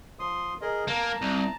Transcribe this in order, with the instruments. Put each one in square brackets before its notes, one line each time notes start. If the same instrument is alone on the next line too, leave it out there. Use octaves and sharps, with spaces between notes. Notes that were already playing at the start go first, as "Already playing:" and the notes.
[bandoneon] F3 C6 D#6
G#4 A#4 D#5
[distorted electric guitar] A#3 [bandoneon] A5 A#5
[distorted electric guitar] C2